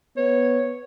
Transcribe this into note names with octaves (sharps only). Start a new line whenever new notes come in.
B3 C#5